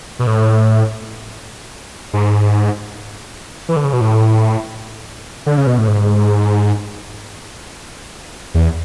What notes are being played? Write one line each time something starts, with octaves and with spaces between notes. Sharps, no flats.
B2
A2
G#2
E3
D3
C#3
B2
A2
D3
C#3
B2
A2
G#2
E2